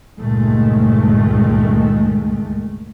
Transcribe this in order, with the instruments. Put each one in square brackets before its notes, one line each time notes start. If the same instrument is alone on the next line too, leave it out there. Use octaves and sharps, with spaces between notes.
[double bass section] C#2 G2 A#2 D#3 G#3 A3